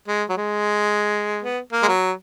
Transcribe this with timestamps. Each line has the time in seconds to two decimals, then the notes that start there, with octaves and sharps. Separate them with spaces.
0.08 G#3
0.29 F#3
0.37 G#3
1.43 B3
1.72 A#3
1.83 G#3
1.88 F#3